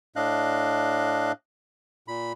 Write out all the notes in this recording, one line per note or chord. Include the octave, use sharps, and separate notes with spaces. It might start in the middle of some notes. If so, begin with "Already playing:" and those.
A2 D4 D#5 F5 F#6
A#2 B5